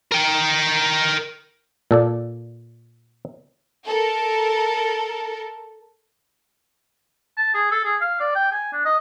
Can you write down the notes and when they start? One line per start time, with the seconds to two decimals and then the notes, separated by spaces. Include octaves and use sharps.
0.12 A#4 G5
1.91 A#2 A4 D5
3.87 A4 A#4
7.37 A5
7.54 G#4
7.72 A4
7.85 G#4
8.01 F5
8.20 D5
8.35 G5
8.52 G#5
8.72 D4
8.85 D#5